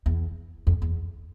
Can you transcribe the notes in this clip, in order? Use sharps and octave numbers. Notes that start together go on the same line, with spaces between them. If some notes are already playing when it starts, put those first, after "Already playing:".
E2
F2
E2